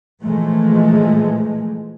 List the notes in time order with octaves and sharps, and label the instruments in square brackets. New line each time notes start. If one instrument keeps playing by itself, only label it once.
[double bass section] A#2 E3 F3 G#3 A3